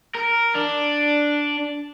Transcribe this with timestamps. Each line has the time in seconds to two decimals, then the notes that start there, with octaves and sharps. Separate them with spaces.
0.15 A#4
0.55 D4